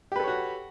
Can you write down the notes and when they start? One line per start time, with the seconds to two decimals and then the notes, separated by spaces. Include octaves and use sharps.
0.12 G4
0.16 B4
0.20 A4
0.24 C#5
0.28 F#4